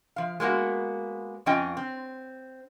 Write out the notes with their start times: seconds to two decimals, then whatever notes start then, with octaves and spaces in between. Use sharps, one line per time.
0.16 F3 F5
0.40 G#3 A#3 B3 F#4
1.46 F2 F3 C#4 F4 D#5 G5
1.77 C4